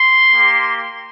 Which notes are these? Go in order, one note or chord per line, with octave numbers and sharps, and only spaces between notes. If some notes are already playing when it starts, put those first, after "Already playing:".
Already playing: C6
A#3 G4